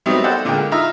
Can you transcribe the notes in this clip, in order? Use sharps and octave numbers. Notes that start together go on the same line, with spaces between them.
F#3 G3 A3 B3 C4 D#4
A4 C5 D5 F#5 G5
A#2 D3 G#3 A#4 G5
D#4 F4 E5 A#5 E6